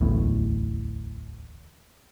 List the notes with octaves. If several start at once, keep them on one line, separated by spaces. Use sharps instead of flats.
D1 A1 E2 A2